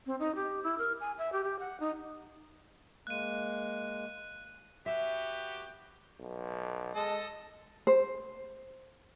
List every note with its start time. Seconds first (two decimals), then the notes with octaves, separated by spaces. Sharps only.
0.06 C4
0.20 D#4
0.35 G4
0.64 E4
0.78 A#4
1.00 G#5
1.18 E5
1.32 G4
1.44 G4
1.60 F#5
1.80 D#4
3.07 G#3 A#3 F#6 D#7
4.86 B3 F#4 G4 E5
6.19 B1
6.95 G#3 A4 D#5 A5
7.87 C5